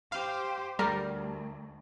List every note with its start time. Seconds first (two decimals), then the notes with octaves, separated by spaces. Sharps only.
0.12 G4 C5 F5
0.79 D2 G3 A#4